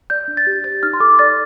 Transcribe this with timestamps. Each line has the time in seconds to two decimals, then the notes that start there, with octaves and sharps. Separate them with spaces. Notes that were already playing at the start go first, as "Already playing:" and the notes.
0.10 D5 G6
0.28 D4
0.37 A6
0.47 G4
0.64 C5 A6
0.83 D#4 F6
0.93 C6
1.00 A4 D6
1.19 D5 A6